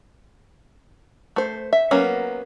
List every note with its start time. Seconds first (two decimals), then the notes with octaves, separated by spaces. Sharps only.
1.36 A3 C5
1.73 E5
1.91 F#3 A#3 B3 C#4